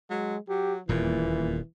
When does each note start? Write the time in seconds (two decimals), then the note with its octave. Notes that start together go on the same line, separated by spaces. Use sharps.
0.10 F#3 G#3
0.49 F#3 G4
0.89 D#1 E2 A#2 E3